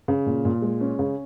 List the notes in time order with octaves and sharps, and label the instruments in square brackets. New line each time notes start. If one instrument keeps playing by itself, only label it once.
[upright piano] C#3
A#2
A#2
G#3
C#4
C#3